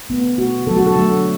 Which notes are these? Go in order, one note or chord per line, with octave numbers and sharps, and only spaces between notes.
D3 A3 B3
B2 A3 F#4
D3 F#3 A3 A4
F#4
A4
D3 F#3 A3